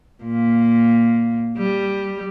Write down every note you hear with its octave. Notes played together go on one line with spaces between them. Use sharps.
A#2
G3